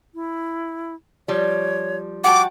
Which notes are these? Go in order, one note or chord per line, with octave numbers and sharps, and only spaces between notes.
E4
F3 G3 C#5
F#4 F#5 G5 A5 D6